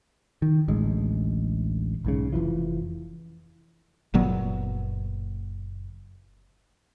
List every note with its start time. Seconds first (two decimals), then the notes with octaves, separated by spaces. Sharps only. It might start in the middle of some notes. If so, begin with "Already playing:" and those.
0.42 D#3
0.68 A1 D2 G#3
2.05 B1 G#2 C#3
2.33 F1 C2 E3 F3
4.14 F#1 A#2 F#3 B3